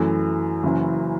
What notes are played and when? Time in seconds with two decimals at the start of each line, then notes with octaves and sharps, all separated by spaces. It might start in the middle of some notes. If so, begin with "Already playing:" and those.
Already playing: F#2 E3 A3
0.63 F#1 F#2 E3